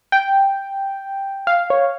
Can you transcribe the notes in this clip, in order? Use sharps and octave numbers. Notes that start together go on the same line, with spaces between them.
G5
F5
C#5